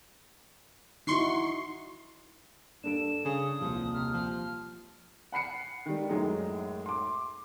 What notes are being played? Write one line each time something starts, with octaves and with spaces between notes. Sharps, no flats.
D#4 E4 F#4 C6 C#6 C7
G2 D4 A4 D7 E7
C#3 D#6
D#1 C2 F3
C3 F6
F3
F#5 B5 C7 C#7
D#3 G3
F#2 A2 F#3 G#3 D#4
C6 D6